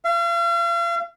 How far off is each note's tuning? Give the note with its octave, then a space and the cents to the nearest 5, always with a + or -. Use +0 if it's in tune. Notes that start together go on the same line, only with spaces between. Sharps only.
F5 -40